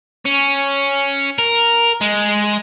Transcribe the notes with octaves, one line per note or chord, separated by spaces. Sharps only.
C#4
A#4
G#3